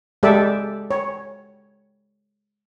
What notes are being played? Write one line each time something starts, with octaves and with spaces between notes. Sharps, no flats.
G#3 G4 A4 D5 E5
C#5